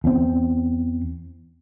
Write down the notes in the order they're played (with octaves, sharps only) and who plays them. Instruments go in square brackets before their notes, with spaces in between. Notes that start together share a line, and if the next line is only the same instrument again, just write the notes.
[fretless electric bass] E2 C4